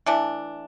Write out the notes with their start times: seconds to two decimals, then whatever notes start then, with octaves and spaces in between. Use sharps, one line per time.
0.06 E3 A3 D4